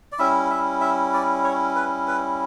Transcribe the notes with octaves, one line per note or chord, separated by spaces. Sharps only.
D5
G3 C#4 E4 E5
E5
E5
D5
C#5
B4
B4